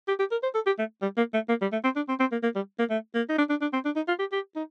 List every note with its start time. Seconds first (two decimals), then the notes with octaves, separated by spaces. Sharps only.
0.08 G4
0.19 G4
0.31 A#4
0.43 C5
0.54 A4
0.67 G4
0.79 A3
1.02 G3
1.17 A#3
1.34 A3
1.49 A#3
1.62 G3
1.72 A3
1.84 C4
1.96 D4
2.09 C4
2.20 C4
2.32 A#3
2.43 A#3
2.55 G3
2.79 A#3
2.90 A3
3.15 A#3
3.29 D#4
3.38 D4
3.50 D4
3.61 D4
3.73 C4
3.85 D4
3.96 D#4
4.08 F4
4.19 G4
4.32 G4
4.56 D#4